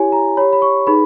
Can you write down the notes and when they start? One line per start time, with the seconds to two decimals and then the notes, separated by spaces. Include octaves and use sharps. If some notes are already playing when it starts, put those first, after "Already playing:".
Already playing: E4 G4 C#5 G#5
0.12 A#5
0.37 G4 C#5 B5
0.53 B5
0.62 C#6
0.87 D#4 G#4 B4 B5